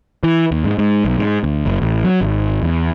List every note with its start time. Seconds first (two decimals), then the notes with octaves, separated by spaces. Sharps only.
0.23 E3
0.51 D#2
0.64 G#2
0.79 G#2
1.05 B1
1.18 G#2
1.44 D2
1.66 F#1
1.82 A1
2.04 F#3
2.21 G#1
2.63 E2